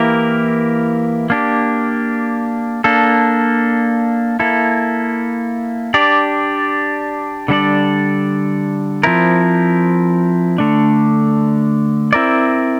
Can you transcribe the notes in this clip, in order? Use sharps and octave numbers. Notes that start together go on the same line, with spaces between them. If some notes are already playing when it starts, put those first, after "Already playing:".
Already playing: E3 A#3 E4 G4 A#4
A#3 D4 G4
A#3 D4 A4
A#3 E4 A4
D4 G4 D5
D3 G3 D4 A4 D5
F3 C4 E4 A#4
D3 A3 D4
C4 E4 A#4 D5